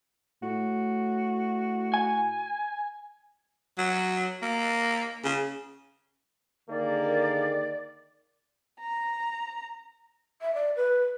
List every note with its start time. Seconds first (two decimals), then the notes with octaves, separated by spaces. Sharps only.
0.43 A2 F#4
1.94 G#5
3.78 F#3
4.42 A#3
5.24 C#3
6.69 D3 D#3 A#3 G#4 A#4 D5
8.80 A#5
10.41 E5
10.54 D5
10.76 B4